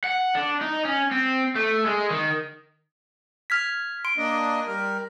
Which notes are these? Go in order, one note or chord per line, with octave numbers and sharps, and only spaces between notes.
F#5
D4
D#4
C#4
C4
A3
G#3
D#3
F6 G#6 B6
C6 D7
A#3 D4 D#5
G3 A#4